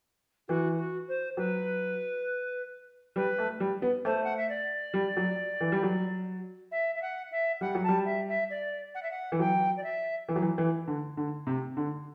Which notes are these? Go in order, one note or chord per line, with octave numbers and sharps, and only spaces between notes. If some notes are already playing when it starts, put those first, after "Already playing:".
E3 F#4
F#4
C5
F#3 B4
G3 B4
A3
G3
B3
A3 C5
F#5
E5
D5
G3
F#3
E3
G3
F#3
E5
E5
F#5
E5
G3 F#5
F#3
A5
G3
E5
E5
D5
F#5
E5
F#5
E3
F#3 G5
D5
E5
E3
F#3
E3
E3
D3
D3
C3
D3